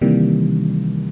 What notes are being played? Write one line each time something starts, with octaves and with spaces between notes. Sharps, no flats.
C3 D#3 E3 G3 A#3